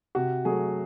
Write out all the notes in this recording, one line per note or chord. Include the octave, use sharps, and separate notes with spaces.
C3 F#4
F#3 A3 G#4